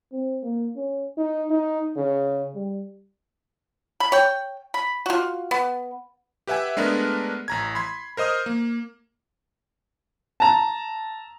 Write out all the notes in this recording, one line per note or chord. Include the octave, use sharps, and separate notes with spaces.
C4
A#3
C#4
D#4
D#4
C#3
G3
B5
C#5 G5
B5
F4 F#4
B3
G4 B4 E5 F#5 G#5
G#3 A3 B3 D4 A#4 B4
A1 A#5 G#6
B5 C6 G#6
A#4 C5 D#5 D#6 F6
A#3
A5 A#5